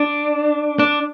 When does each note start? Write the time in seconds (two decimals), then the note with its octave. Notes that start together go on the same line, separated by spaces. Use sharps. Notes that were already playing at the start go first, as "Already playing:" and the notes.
Already playing: D4
0.79 D4